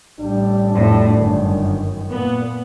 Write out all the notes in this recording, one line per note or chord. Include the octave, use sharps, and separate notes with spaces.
A1 G3 D4
F2 A2
G1 F#2 D#3
A#2 B3